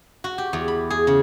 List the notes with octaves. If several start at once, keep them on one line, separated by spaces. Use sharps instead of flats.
F#4
G4
E2
B5
G#4
C#3